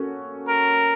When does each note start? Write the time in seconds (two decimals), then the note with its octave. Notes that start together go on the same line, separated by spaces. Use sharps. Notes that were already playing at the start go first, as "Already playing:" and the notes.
Already playing: A#3 C#4 F#4 A4
0.48 A#4